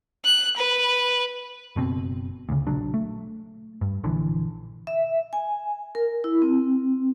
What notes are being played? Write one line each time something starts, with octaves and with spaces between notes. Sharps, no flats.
F#6
B4
F#1 B2 C4
D2 C#3
A#1 F#3 D4
A3
G2
A#1 D3 E3
E5
G#5
A#4
E4
C4